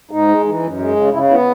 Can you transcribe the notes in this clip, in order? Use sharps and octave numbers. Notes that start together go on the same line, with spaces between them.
G#2 D#4
G#3
E3
F#2
G#3
C#3
C#3 E4
B3 E4